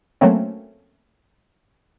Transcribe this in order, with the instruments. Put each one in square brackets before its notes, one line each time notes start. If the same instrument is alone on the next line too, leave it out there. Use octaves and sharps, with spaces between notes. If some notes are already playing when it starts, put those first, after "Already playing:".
[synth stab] F#3 A3 A#3 C4 C#4